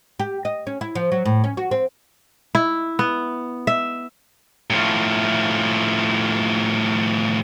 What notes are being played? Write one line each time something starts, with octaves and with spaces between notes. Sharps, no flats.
G4
D#5
C#4
E4
F3
F#3
A2
C#4
F#4
C4
E4
B3
E5
A2 F3